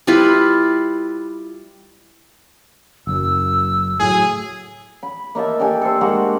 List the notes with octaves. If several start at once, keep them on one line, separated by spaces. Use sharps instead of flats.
G3 E4 F4 B4
F#1 F#2 E6
A2 F#3 G#4
B5
A#3 D#4 E5 A5
D4 G4 A4 G#5
A4 C5
G#3 A#3 F#4 F#5